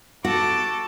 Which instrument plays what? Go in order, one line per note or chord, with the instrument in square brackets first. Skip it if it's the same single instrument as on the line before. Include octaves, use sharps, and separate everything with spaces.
[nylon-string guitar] F#4 [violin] A4 D6